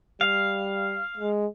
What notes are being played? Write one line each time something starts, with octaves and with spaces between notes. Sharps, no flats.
G3 F5
G#3